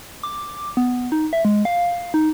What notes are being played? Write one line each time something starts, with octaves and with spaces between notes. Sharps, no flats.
D6
B3
D#4
E5
G#3
F5
D#4